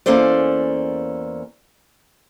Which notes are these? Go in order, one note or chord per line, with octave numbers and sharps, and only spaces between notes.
E2 A#3 C#4 A4 C5 D5